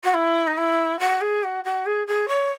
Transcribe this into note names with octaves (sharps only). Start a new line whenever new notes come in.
F#4
E4
D#4
E4
F#4
G#4
F#4
F#4
G#4
G#4
C#5